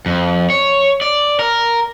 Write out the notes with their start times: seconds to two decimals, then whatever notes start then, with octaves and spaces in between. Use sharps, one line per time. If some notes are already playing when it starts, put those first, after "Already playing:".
0.06 F2
0.50 C#5
1.02 D5
1.39 A#4